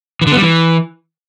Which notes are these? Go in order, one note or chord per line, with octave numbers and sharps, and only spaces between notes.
E3
D3
B3
G3
E3